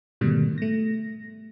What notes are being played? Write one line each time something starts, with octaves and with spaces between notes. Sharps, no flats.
G#2 B2 D3 D#3 G3 A3
A3 A#6